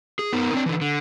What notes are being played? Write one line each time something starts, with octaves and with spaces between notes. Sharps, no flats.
G#4
B3 D#4 A#4
C4 D4
D3 E3
D3